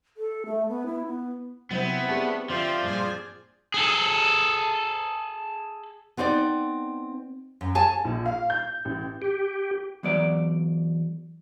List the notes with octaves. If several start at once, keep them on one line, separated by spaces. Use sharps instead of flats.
A4
A3
B3
E4
B3
C3 F#3 B3 C4 E4 C5
A3 D4 G4 G#4 B4 A5
D3 F3 F4 G4 C5 D5 E5
G2 A#2 G#4 G#5
G#4 A4
B3 C4 D#4 C5 D5
F#2
G#4 C#5 G#5 A5
A#1
F5
G6
A1
G4
E2 F#3 D5